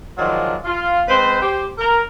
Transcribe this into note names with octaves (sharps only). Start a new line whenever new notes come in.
D#3 F3 F#3 G#3 D4 F4
F4
G#3 C4 B4 C5
G4 C5
A#4